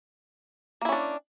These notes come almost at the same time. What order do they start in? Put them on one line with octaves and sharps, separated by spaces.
A#3 E4 C#4 D4